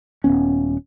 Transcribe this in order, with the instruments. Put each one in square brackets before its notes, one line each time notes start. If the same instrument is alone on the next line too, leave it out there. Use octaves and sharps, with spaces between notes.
[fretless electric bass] D#1 A#2 B3 C#4